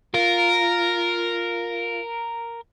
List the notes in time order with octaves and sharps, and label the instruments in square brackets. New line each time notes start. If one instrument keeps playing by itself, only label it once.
[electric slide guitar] F4 [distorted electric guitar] A#4